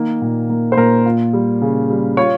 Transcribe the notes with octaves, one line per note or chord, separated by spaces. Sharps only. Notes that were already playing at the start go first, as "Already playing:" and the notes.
Already playing: D#3 A#3
A#2
A#3
C5
A#2 A#4
F4
G3
C#3
G3
F4 C#5